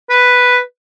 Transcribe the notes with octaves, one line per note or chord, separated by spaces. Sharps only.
B4